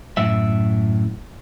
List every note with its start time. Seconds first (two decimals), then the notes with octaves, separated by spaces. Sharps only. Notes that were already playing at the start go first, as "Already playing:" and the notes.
0.17 F#2 A2 E5